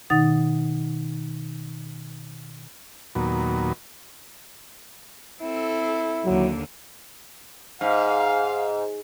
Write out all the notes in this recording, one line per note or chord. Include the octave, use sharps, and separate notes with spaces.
B2 D#3 D#4 F#5 D#6 A6
D#2 A#2 F#3 B3
C4 E4 A4
D#2 D3 F#3
G#2 F5